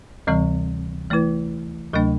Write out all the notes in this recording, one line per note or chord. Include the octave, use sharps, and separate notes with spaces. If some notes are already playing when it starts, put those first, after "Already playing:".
D2 C3 E3 G3 C4
E3 A3 E4 B4
D2 C3 F#3 A3 D4